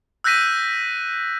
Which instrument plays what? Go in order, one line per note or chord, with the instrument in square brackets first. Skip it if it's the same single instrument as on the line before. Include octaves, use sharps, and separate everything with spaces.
[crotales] E6 F#6 G6 A#6 B6 D#7